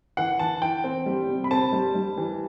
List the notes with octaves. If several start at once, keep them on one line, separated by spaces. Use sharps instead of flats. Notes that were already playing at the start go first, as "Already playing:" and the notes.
E3 F#5
E3 A5
E3 G5
C4
G3
C3
B5
C4 A5
G3
G3
E3